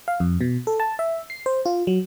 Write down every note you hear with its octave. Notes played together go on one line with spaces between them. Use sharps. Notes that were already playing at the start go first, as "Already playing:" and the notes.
F5
F2
B2
A4
A5
E5
C7
C5
F4
F#3